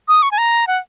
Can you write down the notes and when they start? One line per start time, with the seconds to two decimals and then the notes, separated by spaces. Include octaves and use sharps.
0.08 D#6
0.23 C#6
0.31 G#5
0.38 A#5
0.67 F#5